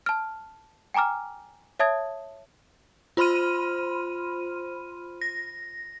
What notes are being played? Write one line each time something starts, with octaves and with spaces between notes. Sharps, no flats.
A5 F6
G5 G#5 A#5 D6 F6
C#5 E5 A5 D#6 G#6
F4 C5 B5 C6 F6 D#7
A#6